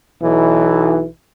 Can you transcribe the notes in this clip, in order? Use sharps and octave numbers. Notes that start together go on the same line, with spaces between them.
B1 E3